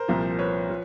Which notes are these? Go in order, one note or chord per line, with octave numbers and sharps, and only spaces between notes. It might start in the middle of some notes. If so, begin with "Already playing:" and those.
Already playing: A#4 C5
C2 A#2 F3
B4 C#5
F3